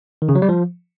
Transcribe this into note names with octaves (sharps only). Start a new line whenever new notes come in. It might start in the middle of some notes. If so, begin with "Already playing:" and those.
D#3
C#3
F#3
G3
F3